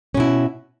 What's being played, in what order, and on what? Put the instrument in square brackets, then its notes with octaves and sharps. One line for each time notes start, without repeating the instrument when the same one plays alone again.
[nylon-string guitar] C#4
B2
E4